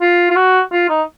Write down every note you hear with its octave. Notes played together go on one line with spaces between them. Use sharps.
F4
F4
F#4
F4
D#4